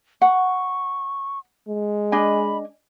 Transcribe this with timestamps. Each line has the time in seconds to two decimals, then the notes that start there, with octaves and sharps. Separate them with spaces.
0.22 F#5 C#6
1.68 G#3
2.12 D4 D#5 G#5 B5